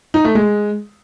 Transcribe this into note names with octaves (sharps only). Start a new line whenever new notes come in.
D#4
A3
G#3